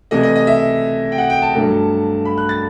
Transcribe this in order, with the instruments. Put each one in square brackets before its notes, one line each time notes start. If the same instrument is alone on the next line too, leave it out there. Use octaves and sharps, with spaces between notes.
[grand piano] C3 E3 A3 D#5
D#5
D#5
E5
G5
F#5
G5
A5
G2 F#3 A3
B5
F#6
A6